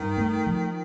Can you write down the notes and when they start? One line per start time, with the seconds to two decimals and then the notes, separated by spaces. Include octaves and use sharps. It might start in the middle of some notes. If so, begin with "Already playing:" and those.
Already playing: G2 D#3
0.17 A3
0.46 F3